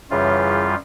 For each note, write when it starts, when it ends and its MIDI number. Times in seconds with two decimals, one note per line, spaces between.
0.10 0.75 42
0.10 0.67 49
0.10 0.67 52
0.10 0.75 55
0.10 0.75 65